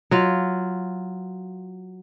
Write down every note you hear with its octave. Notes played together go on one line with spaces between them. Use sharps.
F#3 F4